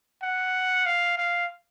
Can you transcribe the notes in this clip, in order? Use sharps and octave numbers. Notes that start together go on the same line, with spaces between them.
F#5
F5
F5